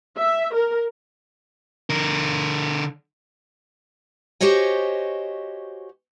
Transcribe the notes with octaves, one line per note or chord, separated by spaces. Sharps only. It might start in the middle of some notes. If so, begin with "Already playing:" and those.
E5
A#4
D3 A#4
F#4 G4 C5 C#5 D#5 G#5